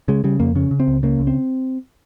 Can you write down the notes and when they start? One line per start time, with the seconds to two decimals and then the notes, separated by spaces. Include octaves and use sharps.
0.08 C#3 G#3
0.24 C#3 G3
0.40 F2 A#3
0.55 C#3 C#4
0.71 C#3
0.80 C4
0.88 C#2
1.03 C#3 A#3
1.19 C#2
1.27 C4